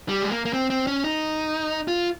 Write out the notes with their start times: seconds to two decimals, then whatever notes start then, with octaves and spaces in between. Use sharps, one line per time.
0.09 G3
0.22 G#3
0.31 A#3
0.45 A#3
0.53 C4
0.70 C4
0.87 C#4
1.04 D#4
1.88 F4